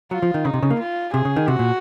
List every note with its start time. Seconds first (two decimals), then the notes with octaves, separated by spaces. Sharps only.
0.11 F#3 F4
0.22 F3
0.34 D#3
0.45 C#3 D#4
0.54 C3
0.63 C#3
0.70 A#3
0.79 F4
1.14 C3 G#4
1.25 C#3
1.36 D#3
1.47 C3 F#4
1.59 A#2